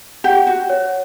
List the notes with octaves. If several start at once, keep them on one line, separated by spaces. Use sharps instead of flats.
G4 F#5
F#4
C#5